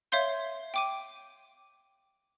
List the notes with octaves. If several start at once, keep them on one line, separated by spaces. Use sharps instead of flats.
C#5 E5 F5 C6 G6
G5 D6 D#7